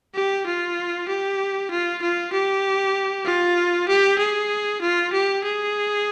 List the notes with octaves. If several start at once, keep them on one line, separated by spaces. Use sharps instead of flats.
G4
F4
G4
F4
F4
G4
F4
G4
G#4
F4
G4
G#4